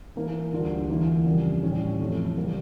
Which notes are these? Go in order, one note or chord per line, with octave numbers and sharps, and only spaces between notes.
E3 A#3 E4 A#4
D2 D3 G3 D4 F4
E2 E3 A#3 E4
F2 C#3 G3
A2 G3 C#4
F2 E3 A3
C#3 G3 A#3